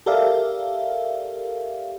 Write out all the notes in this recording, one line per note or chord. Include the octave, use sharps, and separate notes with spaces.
G4 A4 A#4 D5 E5 F5